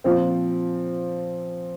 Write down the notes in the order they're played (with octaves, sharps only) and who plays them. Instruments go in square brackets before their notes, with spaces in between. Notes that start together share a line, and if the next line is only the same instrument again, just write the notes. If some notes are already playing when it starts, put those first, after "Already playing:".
[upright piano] A#2 F3 C4